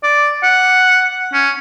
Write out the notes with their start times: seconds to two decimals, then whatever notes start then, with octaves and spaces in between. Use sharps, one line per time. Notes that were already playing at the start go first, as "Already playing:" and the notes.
0.03 D5
0.43 F#5
1.34 C#4